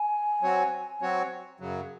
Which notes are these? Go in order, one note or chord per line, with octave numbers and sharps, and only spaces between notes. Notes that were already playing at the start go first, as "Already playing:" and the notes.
Already playing: G#5
F#3 C4 F#4 C#5
F#3 C4 F#4 C#5
F#2 C#3 F#3